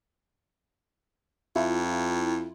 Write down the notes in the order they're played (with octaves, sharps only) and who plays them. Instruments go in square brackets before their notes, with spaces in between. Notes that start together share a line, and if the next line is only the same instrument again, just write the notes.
[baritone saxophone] F2 [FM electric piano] E4 F4